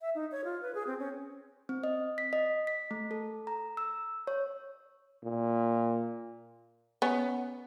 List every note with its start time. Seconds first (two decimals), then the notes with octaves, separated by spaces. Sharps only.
0.01 E5
0.15 D#4
0.32 C#5
0.45 F4
0.62 B4
0.75 G#4
0.87 C4
0.99 C#4
1.69 C4
1.84 D#5
2.18 B6
2.33 D#5
2.67 B6
2.91 A3
3.11 A4
3.47 A#5
3.77 E6
4.27 C#5
5.23 A#2
7.02 B3 C#4